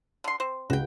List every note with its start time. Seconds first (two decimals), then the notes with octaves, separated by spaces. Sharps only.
0.24 D3 C6
0.40 C4 C5
0.70 C#2 F#4 G5